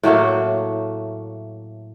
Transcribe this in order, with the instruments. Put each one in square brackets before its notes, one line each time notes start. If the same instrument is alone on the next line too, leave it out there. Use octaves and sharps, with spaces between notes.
[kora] A2 F#3 A3 A#3